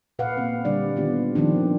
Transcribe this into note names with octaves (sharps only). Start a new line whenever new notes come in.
A#2 B4 F5 F#5
A#3 C4
D3 G3 D4 D5
D#3 B3 F4 G4
D#3 F3 C4 D4